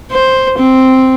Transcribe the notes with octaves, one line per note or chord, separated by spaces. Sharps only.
C5
C4